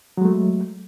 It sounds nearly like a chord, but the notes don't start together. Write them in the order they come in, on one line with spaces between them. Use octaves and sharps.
F#3 G#3 A3